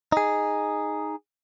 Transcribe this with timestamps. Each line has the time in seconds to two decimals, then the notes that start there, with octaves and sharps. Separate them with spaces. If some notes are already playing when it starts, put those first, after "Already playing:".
0.12 D#4 G#4